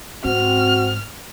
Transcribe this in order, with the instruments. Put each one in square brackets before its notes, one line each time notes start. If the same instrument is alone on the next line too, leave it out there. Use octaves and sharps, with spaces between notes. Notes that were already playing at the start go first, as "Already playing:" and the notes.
[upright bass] G#2 [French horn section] C4 [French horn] F#4 [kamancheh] F6